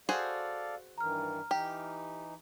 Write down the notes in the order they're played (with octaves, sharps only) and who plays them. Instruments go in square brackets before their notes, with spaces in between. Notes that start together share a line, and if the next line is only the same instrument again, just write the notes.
[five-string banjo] F#4 G#4 C5 [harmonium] A4 D5 F5
[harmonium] G2 D#3 E3 [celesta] A#5 F6
[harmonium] E3 D#4 [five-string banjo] G4